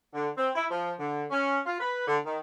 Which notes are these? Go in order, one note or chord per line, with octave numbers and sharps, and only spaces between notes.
D3
C4
E4
F3
D3
C#4
F4
B4
D3
D#3